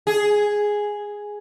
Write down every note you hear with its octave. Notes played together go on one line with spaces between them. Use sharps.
G#4